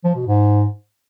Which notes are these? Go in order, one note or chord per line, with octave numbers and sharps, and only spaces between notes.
F3
B2
G#2